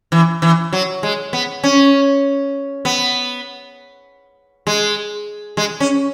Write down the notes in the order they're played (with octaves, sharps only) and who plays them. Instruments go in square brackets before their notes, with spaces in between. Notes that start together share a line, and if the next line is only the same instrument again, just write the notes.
[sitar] E3
E3
F#3
G#3
B3
C#4
B3
G#3
G#3
C#4